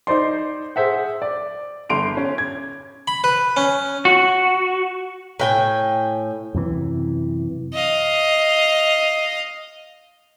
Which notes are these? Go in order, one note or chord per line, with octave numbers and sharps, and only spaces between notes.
D#4 C5 D5 C6
G#4 C5 E5 F#5
D5
G1 C6 D7 F7
C#4
G#6
B5
B4
C#4
F#4
A2 G5 G#5
F#2 C3 E3
D#5 F5